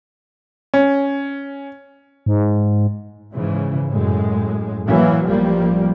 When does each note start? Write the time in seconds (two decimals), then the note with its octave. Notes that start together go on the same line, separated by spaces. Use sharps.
0.74 C#4
2.26 G#2
3.33 G#2 C#3 E3
3.90 F#2 A2 G#3
4.85 A2 E3 F#3 A#3
5.25 A1 F3 G3 A#3